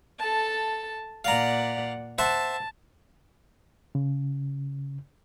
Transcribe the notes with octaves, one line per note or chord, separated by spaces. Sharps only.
A4 A5
A#2 D5 F5 F#5 A#5
C5 E5 F#5 A5
C#3